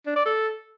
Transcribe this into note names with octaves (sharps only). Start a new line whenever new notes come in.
D4
D5
A4